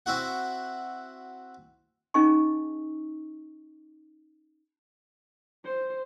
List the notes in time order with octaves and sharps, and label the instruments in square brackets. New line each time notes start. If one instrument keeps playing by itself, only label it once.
[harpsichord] C4 E4 F#4 F#5
[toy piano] C#4 D#4 G#4 D#5 G#5 C#6
[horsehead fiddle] C5